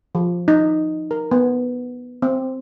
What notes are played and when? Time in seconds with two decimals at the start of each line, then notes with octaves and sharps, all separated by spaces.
0.15 F3
0.48 D#4
1.11 A#4
1.31 B3
2.22 C4